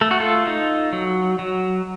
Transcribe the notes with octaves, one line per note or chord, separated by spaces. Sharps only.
A3 A4
F#4
F4 A4
D#4
F#3
F#3